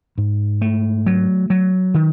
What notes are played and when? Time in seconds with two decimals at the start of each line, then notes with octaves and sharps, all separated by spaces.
0.18 G#2
0.62 A3
1.06 F#3
1.50 F#3
1.94 D#3